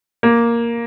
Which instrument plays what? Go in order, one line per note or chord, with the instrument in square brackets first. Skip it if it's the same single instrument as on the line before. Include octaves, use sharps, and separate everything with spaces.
[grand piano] A#3